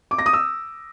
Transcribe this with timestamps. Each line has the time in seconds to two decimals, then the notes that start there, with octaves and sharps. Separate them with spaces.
0.11 D6
0.18 A#6
0.26 D#6
0.33 E6